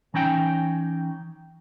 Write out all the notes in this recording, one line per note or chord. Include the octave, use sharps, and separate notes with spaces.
E3 C#4 D#4 G5